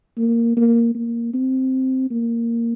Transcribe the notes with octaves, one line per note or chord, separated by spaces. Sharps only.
A#3
A#3
A#3
C4
A#3